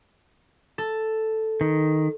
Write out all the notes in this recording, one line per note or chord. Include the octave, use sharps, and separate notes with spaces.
A4
D#3